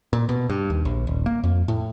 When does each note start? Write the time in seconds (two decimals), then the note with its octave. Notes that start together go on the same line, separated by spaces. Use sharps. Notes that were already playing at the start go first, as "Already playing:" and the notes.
0.13 A#2
0.29 B2
0.50 G2
0.70 D#2
0.85 A#1
1.07 D#1
1.26 A#3
1.44 F2
1.68 A2